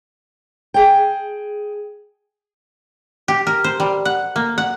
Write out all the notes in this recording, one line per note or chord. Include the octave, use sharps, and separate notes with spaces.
G#4 G5
G4
A#4
C5
G3
F#5
A#3
F#5